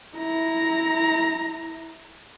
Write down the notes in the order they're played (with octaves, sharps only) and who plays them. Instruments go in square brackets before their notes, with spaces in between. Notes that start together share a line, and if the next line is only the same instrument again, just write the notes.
[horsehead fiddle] E4 A#5